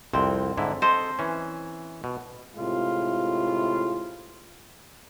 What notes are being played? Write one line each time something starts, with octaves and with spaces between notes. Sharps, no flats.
C2 F2 C4
G#2 D3 E4
A4 C5 D#5
E3 C#4
B2
A2 C3 G#3 F4